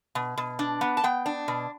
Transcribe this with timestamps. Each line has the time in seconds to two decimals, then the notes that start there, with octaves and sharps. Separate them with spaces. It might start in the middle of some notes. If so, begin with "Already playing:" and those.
0.15 B2
0.38 B2
0.59 D4
0.81 B3
0.97 A5
1.04 B3 G5
1.26 D4
1.48 B2